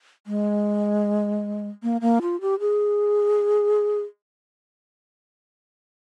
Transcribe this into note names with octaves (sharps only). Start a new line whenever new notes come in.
G#3
A#3
A#3
F4
G4
G#4